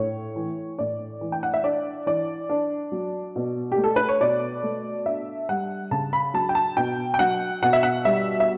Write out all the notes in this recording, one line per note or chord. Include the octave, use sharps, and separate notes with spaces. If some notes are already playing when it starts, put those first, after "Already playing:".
Already playing: A2 C#5
E3
A2 D5
E3
G5
F#5
E5
D4 D5
E3 D5
D4
F#3
B2
G4
A3
A4
B4
C#5
B2 D5
A3
D4 E5
G3 F#5
C#3 A5
B5
F#3 A5
G5
A5
B2 G5
G5
F#3 F#5
B2 F#5
E5
F#5
G3 E5
E5